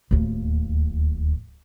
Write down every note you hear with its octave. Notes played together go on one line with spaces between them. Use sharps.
D1 D#2